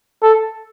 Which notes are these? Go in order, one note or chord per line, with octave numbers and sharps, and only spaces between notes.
A4